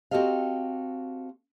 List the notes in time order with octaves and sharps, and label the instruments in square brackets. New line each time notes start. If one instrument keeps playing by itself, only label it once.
[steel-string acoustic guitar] C4 F#4 G4 A4 D#5 F5